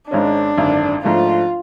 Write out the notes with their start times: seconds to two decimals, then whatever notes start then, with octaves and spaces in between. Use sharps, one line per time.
0.11 G#1 G#2 G#3 C#4 D4
0.57 G#1 F#2 D3
1.03 G#2 F3 A3 D4 F4